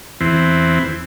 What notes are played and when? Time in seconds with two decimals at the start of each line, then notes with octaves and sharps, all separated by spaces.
0.21 E2 E3 C4